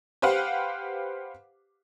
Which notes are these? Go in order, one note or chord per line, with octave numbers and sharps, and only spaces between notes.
G4 B4 C5 F5 F#5